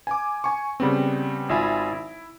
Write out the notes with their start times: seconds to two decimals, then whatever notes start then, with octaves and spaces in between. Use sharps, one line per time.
0.07 G#5 D6
0.44 G#5 C#6
0.80 C#3 G3 B3 C4
1.49 G#1 F4 E5 G#5 B5
1.92 E4